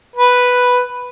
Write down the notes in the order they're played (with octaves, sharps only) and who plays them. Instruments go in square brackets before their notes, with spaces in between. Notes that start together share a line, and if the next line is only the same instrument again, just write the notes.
[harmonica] B4